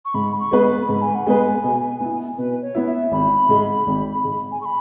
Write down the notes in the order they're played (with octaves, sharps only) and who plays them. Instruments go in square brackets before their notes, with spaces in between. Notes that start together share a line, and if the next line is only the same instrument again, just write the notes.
[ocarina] C#6
[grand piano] G#2 [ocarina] B5
[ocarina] C#6
[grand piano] G#3 B3 G#4 B4
[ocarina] B5
[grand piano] G#2 [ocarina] B5
[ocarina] G#5
F#5
[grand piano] G#3 B3 G#4 B4 [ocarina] G#5
[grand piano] B2
B3 E4
[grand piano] B2 [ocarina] B4
[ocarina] C#5
[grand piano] B3 E4
[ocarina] E5
[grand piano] G#1 [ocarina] B5
[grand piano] G#2 G#3
G#1
G#2 G#3
[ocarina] G#5
C#6
B5